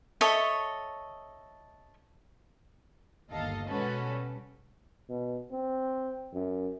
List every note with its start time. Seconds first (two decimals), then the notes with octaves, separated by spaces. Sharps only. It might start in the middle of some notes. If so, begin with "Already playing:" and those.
0.21 A4 C#5 D#5 E5
3.31 G1 D#2 A4 D#5 F5
3.66 B2 G#3 C#4 F#4 A4 B4
4.10 G3
5.09 B2
5.51 C4
6.33 F#2